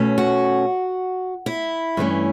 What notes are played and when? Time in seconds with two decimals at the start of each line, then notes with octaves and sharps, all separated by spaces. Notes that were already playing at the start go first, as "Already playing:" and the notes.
Already playing: B2 A3 C#4
0.18 F#4
1.46 E4
1.97 G2 E3 A3 C#4